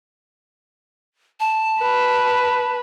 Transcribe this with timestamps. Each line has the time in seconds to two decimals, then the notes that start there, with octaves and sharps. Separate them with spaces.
1.40 A5
1.81 B4